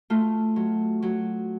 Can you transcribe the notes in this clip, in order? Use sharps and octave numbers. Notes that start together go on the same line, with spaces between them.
A3 F4
F#3
F#3